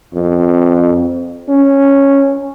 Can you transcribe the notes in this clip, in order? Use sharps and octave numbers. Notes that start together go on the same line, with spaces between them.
F2
C#4